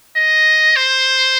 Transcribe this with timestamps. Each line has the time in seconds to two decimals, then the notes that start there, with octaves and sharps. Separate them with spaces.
0.16 D#5
0.76 C5